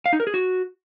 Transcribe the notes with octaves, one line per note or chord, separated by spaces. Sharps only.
F5
D#4
A#4
G#4
F#4